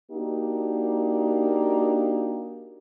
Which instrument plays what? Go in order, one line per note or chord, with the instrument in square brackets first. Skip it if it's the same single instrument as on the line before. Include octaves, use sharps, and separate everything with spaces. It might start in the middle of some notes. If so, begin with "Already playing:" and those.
[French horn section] A#3 D4 D#4 F#4 G4